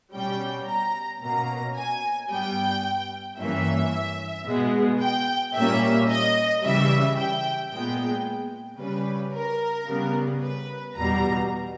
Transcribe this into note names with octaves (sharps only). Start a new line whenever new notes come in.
B2 G3 C#4 G5
A#5
B2 A#3 C#4 A#5
G#5
G2 G3 B3 G5
G2 E3 A#3 C#4 E5
B2 G#3 B3
G5
A#2 G3 A#3 C#4 E5
D#5
C#3 E3 G3 E5
G5
A#2 G#3 B3 G5
C#3 G3 C#4 B4
A#4
C#3 G3 B3
B4
E2 B2 G3 A#5